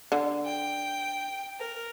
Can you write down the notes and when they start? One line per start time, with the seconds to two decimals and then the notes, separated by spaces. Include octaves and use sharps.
0.12 D3
0.45 G5
1.59 A#4